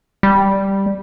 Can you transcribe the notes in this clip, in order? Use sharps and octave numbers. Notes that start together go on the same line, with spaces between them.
G3